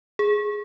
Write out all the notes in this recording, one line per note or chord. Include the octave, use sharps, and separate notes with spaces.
G#4